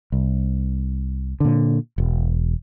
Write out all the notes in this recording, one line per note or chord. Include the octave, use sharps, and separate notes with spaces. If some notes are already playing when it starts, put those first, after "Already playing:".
C2
A#2 D3
E1